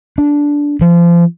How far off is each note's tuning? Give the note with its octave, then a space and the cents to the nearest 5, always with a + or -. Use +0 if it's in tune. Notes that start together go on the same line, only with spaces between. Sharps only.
D4 -10
F3 -30